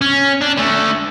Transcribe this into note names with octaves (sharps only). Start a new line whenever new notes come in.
C#4
D4
D3 A3